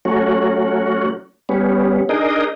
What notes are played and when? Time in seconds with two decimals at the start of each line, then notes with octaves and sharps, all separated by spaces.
0.05 F#3 A3 C#4 F#4
1.49 G3 B3 C#4
2.09 D4 D#4 G#4 A#4 D#5